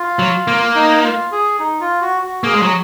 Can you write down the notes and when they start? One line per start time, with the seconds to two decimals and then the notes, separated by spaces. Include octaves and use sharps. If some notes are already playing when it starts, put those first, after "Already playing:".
Already playing: F4
0.19 F#3
0.47 A#3
0.75 D#4
1.04 F4
1.32 G#4
1.59 D#4
1.80 F4
2.02 F#4
2.22 F#4
2.44 A#3 G#4
2.54 G#3
2.62 F#3